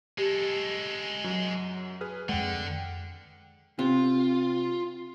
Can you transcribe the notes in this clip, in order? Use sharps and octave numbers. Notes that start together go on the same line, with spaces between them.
G#3 G4 A4
F#2 F#3
G#4 B4 F6
F2 D3 G#3 F#5 G5
C3 F4